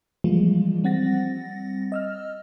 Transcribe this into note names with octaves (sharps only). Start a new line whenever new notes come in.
E3 F3 G3 G#3 A#3 F4
G3 C4 F#5 A6 A#6
D#5 E6 F6